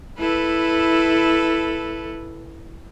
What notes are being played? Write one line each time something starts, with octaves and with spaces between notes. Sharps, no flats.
E4 A4 B4